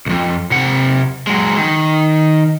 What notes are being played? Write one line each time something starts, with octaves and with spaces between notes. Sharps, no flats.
C2 F2
C3 F#5
F#3 G#3
D#3